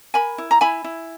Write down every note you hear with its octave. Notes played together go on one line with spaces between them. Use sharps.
A#4 G#5 B5
E4
A#5
E4 G#5 B5
E4